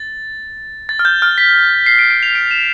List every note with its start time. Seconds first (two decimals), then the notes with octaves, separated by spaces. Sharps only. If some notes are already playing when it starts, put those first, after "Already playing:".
Already playing: A6
0.89 A6
0.99 F6
1.05 G6
1.22 F6
1.38 B6
1.86 C7
1.99 D7
2.10 D7
2.23 F7
2.35 D7
2.51 E7